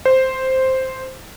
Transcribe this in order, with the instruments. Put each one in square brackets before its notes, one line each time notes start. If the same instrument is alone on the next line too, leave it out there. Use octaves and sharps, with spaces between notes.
[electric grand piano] C5